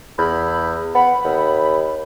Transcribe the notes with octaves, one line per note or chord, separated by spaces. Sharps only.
E2 B5
B3 B5
D#2